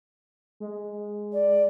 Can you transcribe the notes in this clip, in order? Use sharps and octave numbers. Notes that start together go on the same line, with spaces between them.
G#3
D5